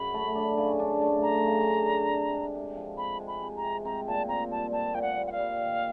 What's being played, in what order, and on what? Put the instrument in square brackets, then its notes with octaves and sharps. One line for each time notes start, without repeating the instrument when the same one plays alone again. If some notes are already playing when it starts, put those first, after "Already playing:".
Already playing: [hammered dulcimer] F#2 C#3 F#3 [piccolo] B5
[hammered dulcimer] A3
D4
C#3
D4
A3
[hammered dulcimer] A3 [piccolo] A#5
[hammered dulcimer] C#3
D4
D4
C3
G#3
C3
F3
[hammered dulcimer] C3 [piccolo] B5
[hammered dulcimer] G#3
[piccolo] B5
[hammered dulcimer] C3
[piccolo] A#5
[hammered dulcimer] C3
[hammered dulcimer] C4 [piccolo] A#5
[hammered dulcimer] A#2 [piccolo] A5
[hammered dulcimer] C4 [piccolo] A#5
[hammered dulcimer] G3 [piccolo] A5
[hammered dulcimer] C4 [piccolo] A5
[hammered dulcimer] A#2 [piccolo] G5
[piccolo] F#5
[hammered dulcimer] G3
[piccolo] F#5
F5
[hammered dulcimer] G3
D#3